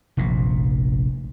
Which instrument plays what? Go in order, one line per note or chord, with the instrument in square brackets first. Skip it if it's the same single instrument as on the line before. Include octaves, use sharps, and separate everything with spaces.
[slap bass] F1 A#1 A#2